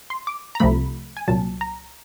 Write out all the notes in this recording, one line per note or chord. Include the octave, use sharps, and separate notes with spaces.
C6
D6
A#5
C2 C3 F3 A3 B5
G#5
C2 A#2 F#3 A5
A#5